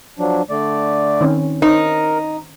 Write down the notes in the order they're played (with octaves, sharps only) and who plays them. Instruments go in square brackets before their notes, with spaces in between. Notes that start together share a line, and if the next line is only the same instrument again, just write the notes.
[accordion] F3 F#3 D4
D3 A3 D5
[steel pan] D#3 C4 C#4
[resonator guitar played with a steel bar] D#4 [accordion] A#4 [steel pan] C5 C#5